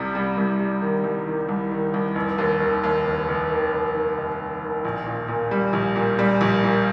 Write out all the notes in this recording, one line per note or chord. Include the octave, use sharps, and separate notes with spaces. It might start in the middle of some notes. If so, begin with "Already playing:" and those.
Already playing: C2 C3 G3
G3
C2
G3
D#3
C2
D#3
C2
D#3
C2
F1
D#2
D#3
D#2
F1
F1
D#3
F1
D#3
F1
D#3
D#3
A#1
A#2
A#2
G3
A#1
A#2
G3
A#1
A#2